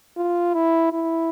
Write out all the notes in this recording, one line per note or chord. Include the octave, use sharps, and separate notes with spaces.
F4
E4
E4